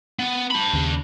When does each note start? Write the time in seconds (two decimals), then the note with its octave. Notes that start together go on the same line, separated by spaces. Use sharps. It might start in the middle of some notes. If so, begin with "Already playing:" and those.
0.19 B3
0.51 D4 B5
0.73 D#2 C#3